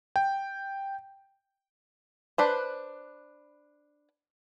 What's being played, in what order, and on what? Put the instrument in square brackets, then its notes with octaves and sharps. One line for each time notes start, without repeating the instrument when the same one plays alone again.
[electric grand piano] G5
[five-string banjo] D4 B4 C5